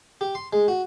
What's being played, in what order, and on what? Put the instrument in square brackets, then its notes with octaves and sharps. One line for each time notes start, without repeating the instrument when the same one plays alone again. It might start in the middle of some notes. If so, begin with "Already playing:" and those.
[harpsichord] G4
C6
G#3
F#4